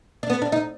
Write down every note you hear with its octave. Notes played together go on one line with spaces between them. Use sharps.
D4
B3
D4
D#4